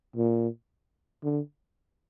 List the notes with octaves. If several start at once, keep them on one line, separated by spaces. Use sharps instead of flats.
A#2
D3